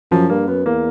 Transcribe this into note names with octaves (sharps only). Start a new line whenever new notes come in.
F#2 F3
G2 A#3
F#2 B3
E2 A#3